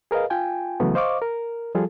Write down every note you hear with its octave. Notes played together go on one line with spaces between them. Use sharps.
G#4 A#4 B4 D#5 F5
F4 G5 G#5
C#3 E3 F#3 A3 B3
C5 D#5 F5 C#6 D6
A#4
F3 G3 F4 G#4 A4